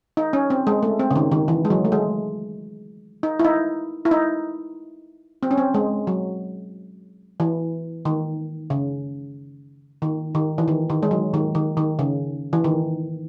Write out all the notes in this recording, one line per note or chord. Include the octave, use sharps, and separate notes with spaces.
D#4
C#4
C4
G#3
A3
C4
C#3
D#3
D#3
E3
G#3
F#3
A3
G#3
D#4
E4
D#4
E4
D#4
C4
C#4
C4
G#3
F#3
E3
D#3
C#3
D#3
D#3
E3
D#3
D#3
G#3
F#3
D#3
D#3
D#3
C#3
E3
D#3